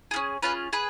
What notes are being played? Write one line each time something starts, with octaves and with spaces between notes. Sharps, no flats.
C#4 F4 G#4
C#4 F4 G#4 B4
G#4 B4